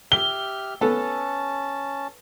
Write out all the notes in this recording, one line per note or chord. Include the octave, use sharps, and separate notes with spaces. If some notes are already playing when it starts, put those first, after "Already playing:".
G4 E5 F6 G7
B3 C#4 A4 A5